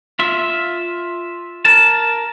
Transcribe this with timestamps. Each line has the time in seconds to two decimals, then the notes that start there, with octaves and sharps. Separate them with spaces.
0.19 F4 E5
1.65 A#4 A5